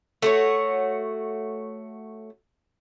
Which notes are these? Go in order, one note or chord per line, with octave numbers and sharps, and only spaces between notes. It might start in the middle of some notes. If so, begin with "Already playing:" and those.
A3 F#4 C#5